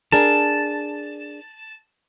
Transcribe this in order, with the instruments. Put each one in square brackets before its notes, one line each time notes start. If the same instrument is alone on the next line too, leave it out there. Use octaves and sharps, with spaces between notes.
[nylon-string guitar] D4 G#4 A#4 [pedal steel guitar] A5